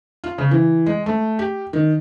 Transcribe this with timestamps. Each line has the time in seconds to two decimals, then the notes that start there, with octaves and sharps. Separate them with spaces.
0.24 F4
0.38 C#3
0.51 E3
0.86 G#3
1.06 A3
1.39 G4
1.73 D#3